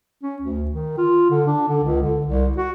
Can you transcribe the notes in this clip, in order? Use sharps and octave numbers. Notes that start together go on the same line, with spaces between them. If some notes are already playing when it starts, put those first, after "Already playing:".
C#4
D2
D#3
F4
D3
D4
D3
C#2
D3
C2
F#4